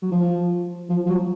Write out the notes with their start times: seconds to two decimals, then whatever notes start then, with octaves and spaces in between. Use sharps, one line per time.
0.02 F#3
0.11 F3
0.89 F3
1.06 F3
1.09 F#3